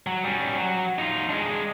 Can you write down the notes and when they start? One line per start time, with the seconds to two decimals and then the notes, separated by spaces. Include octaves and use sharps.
0.07 F#3
0.24 G3 C#4
0.58 F#3
0.98 D#4 F4
1.29 G#3 D4